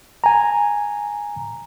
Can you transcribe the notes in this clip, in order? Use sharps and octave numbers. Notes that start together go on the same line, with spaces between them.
G#5 A#5